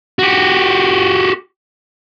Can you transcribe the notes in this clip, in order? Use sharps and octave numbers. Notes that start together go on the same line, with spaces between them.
F#4 G4